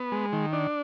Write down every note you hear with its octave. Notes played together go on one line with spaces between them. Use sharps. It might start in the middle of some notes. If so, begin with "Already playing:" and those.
Already playing: B3
G#3
D#3
D4